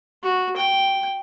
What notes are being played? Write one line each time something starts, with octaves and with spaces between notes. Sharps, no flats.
F#4
G5